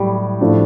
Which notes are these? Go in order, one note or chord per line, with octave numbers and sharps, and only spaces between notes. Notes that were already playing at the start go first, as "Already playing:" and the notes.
Already playing: A2 F#3 G3
A2 F3 A3 D4